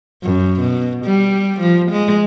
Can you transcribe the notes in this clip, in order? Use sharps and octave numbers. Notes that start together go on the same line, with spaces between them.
F#2
B2
G3
F3
G#3